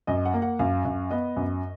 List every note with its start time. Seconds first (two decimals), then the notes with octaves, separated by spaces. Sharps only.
0.07 F#2 D#5
0.25 F#5
0.34 A#3
0.42 F#5
0.59 F#2 F5
0.85 F#2
1.11 B3 D#5
1.36 F#2